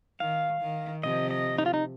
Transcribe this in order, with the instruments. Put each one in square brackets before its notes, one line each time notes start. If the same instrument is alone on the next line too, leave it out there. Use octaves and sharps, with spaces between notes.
[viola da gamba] D#3 [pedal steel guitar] F5
[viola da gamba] D#3
[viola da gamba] C3 F3 [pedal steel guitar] D#5
[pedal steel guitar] D#5
D#4
F4
D#4